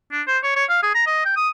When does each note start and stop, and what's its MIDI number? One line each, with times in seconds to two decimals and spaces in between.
0.12 0.22 62
0.27 0.38 72
0.44 0.55 73
0.56 0.64 73
0.70 0.78 77
0.83 0.91 68
0.95 1.04 82
1.07 1.22 75
1.25 1.33 79
1.37 1.49 87